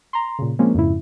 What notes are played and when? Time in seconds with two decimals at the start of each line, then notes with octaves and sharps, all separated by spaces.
0.13 A#5 C6
0.39 A#2 C#3
0.59 F3 G#3 A#3 C4 C#4
0.74 F2 G#2 C#3 E4